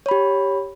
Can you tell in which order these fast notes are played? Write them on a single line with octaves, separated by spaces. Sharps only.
C#5 B5 G4